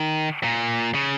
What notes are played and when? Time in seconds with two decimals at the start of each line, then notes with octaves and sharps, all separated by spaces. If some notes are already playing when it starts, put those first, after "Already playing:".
Already playing: D#3
0.43 A#2
0.95 C#3